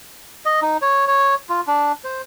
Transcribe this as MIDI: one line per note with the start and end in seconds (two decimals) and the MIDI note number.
0.46 0.60 75
0.62 0.77 63
0.82 1.05 73
1.07 1.35 73
1.49 1.61 65
1.67 1.92 62
2.04 2.22 72